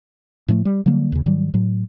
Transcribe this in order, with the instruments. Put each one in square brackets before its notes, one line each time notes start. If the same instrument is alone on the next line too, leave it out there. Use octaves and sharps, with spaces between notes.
[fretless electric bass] A2 F3 G#3 A3
G3
D3 F#3 G3 A#3
D#2 C#3
G#2 D#3 F#3 G3
A2 F#3